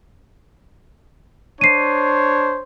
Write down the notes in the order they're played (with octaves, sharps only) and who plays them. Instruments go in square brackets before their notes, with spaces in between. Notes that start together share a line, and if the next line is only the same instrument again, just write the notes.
[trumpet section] D4 C5 C#5 [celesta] C7 D#7